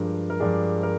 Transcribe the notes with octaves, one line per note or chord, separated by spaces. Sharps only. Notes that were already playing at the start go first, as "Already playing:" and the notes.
Already playing: G2 F3 G#3 D4 A#4
A#4
G2 F3 G#3 D4 G#4
A#4